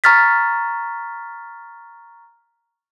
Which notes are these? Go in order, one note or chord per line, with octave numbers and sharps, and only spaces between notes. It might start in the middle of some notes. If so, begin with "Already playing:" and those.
A#5 C#6 F6 A6 B6